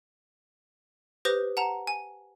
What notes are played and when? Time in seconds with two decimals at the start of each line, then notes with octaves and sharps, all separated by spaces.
1.25 G4 B4 C5 D#6 G6 A#6
1.57 F#5 A5 A#5
1.87 G#5